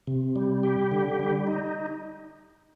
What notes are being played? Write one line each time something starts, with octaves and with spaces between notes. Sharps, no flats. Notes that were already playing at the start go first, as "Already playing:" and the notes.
C3
G3
G4
D3
G3
D#4